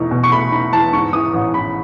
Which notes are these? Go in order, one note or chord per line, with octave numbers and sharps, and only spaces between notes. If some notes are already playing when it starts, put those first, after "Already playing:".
Already playing: E2 B2 A3 D#4
B2
C#6
A3 B5
D#4 B5
E2 A5
G#2 C#6
E3 D#6
A1 D#6
A1 B5